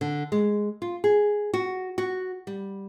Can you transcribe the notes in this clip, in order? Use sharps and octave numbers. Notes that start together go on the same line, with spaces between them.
D3
G#3
F4
G#4
F#4
F#4
G3